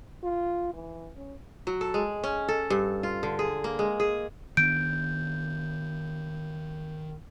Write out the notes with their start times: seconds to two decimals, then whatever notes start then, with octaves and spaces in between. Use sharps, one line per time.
0.24 F4
0.73 E3
1.17 C#4
1.67 F#3
1.81 A4
1.94 G#3
2.24 C#4
2.48 A4
2.70 G2
3.03 F4
3.23 D3
3.39 G#4
3.64 A#3
3.79 G#3
4.00 G#4
4.57 D#3 B3 D4 G6 D7